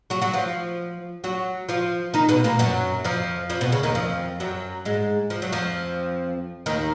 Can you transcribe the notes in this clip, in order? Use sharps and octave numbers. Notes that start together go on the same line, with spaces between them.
F#3 F#4
F#3 F#4
F3 F4
F#3 F#4
F3 F4
D#3 D#4
B2 B3
A#2 A#3
F#2 F#3
F2 F3
F2 F3
B2
C#3
D#2 D#3
F2 F3
F#2 F#3
G#2 G#3
F3
F#3
F2 F3
D#2 D#3